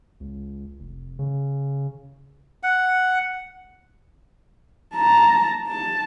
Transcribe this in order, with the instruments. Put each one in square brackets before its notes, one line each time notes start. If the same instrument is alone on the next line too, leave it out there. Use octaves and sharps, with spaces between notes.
[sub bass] C#2
F1
C#3
[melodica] F#5
[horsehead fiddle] A5 A#5
A5